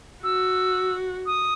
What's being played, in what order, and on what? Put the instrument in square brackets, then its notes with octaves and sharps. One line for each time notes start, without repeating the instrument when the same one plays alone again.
[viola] F#4 [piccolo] E6
[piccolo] D#6